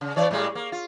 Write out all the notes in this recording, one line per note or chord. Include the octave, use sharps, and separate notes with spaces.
C#3
E3 C#5 D5
A2 G3 G#3
A#3
F4